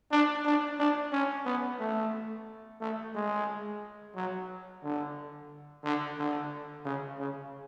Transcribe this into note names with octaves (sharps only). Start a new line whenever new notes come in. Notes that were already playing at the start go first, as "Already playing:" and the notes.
D4
D4
D4
C#4
B3
A3
A3
G#3
F#3
D3
D3
D3
C#3
C#3